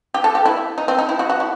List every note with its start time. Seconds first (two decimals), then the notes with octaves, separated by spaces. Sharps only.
0.14 G4
0.24 A4
0.35 G4
0.46 E4
0.78 D#4
0.88 C4
0.99 D#4
1.09 E4
1.19 F#4
1.30 F#4
1.40 E4